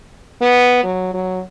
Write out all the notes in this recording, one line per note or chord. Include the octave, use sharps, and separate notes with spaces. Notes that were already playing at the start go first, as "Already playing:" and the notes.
B3
F#3
F#3